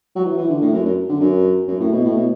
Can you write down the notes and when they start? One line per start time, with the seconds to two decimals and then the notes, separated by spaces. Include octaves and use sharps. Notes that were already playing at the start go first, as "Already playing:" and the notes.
0.16 F#3
0.25 E3
0.37 E3
0.49 D3
0.61 A2
0.73 F#2
0.85 F#2
1.09 D3
1.20 F#2
1.68 F#2
1.80 A2
1.92 B2
2.04 A2
2.16 B2